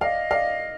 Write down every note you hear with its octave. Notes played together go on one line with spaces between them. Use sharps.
D5 D#5 F5
D5 F5